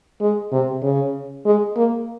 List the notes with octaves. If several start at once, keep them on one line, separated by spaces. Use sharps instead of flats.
G#3
C3
C#3
G#3
A#3